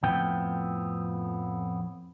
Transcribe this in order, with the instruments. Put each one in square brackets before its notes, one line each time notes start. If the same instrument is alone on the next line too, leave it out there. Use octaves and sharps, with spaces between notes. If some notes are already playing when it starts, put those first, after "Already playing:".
[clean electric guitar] F2 A2 F3 B3 C4 G5